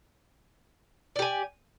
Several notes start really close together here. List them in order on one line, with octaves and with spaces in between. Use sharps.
D5 G4 G#5